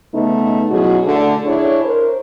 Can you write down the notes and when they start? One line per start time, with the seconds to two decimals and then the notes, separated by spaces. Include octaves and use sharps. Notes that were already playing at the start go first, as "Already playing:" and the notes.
0.13 C#3 A3 B3 D#4
0.70 B2 F#3 C#4 E4 F#4 G#4
1.05 D3 A3
1.46 D4 E4 G#4 C#5
1.83 A#4 C5